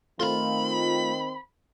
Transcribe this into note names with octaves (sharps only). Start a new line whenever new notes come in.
D#3 A3 C4 F4 B5 C6